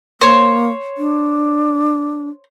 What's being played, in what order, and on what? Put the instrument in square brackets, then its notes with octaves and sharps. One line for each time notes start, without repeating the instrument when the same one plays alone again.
[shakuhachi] A#3 [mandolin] C5 C#5
[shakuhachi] D4